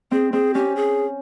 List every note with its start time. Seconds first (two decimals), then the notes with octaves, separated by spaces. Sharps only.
0.11 C4 G#4
0.32 C4 G#4
0.54 C#4 G4
0.76 G#4